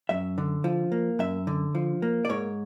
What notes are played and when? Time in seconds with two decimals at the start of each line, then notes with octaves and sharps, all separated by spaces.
0.09 F#2 E5
0.38 D3
0.64 F3
0.92 A#3
1.19 F#2 E5
1.47 D3
1.75 F3
2.02 A#3
2.25 D5
2.29 G#2 C#5